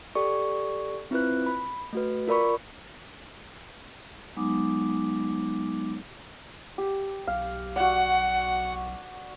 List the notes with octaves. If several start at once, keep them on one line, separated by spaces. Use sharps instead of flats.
G4 A4 D5 C#6
C4 E4 F4 B4 F#6
B5
A3 F#4 B4
F4 A#4 D5 B5 C#6
F#3 G#3 B3 D#4 D6
G4
B1 F5
F#4 D5 F#5